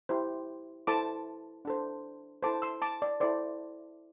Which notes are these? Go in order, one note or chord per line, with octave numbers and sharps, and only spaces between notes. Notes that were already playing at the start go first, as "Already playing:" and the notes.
E4 G4 C5
E4 A4 C5 A5 D6
D4 A4 C5
E4 A4 C5 A5 D6
C6 E6
A5 D6
D5
E4 A4 C5 D5